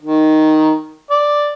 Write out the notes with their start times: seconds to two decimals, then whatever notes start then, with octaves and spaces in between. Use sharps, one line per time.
0.02 D#3
1.11 D5